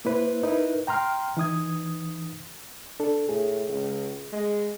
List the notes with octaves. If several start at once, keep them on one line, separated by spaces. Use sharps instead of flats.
A#3 E4 B4 C5
D#4 E4 A#4 B4
G5 A#5 C6 F6
E3 D#4 D#6 G#6
D4 A4
A2 G#4
C#2
G#3